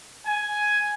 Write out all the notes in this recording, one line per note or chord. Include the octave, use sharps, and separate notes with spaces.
G#5